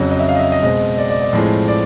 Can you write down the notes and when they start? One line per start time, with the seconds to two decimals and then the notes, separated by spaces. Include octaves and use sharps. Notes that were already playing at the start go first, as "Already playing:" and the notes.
Already playing: F2 C#3 F#3
0.11 D#5
0.20 E5
0.29 F5
0.35 D#5
0.39 E5
0.52 D#5
0.63 B2 G#3 C4 D#5
0.98 D5
1.10 D5
1.22 D5
1.33 A2 F3 G#3 C4
1.68 D5